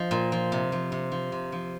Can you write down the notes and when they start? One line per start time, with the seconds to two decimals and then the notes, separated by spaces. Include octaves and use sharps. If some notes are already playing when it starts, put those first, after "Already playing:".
Already playing: F3 D#5
0.11 A#2
0.32 F3
0.52 C3
0.72 F3
0.92 C3
1.12 F3
1.32 C3
1.52 F3